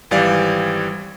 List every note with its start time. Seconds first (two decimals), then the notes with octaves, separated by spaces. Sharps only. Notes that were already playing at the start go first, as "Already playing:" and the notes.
0.11 G#1 E3 G3 D5 F5